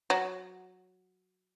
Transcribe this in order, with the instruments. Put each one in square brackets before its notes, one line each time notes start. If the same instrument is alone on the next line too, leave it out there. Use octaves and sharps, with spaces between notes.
[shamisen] F#3